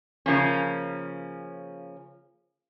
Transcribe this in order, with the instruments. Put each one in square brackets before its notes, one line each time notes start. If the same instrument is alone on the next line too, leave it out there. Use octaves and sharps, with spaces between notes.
[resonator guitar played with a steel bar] C#3 F3 A#3 C#4